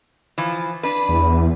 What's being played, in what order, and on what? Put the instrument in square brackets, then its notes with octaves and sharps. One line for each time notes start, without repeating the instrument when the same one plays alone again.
[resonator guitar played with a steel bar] E3 F3
D4 B4
[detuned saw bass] E2